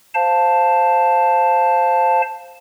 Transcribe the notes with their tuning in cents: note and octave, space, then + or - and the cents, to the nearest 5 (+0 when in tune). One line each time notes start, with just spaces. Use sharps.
C5 +0 F5 +0 A5 +0